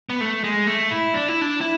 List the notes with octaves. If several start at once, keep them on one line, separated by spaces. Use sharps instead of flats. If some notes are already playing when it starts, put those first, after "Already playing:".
B3
A3
G#3
A3
E4
D4
E4
D4
E4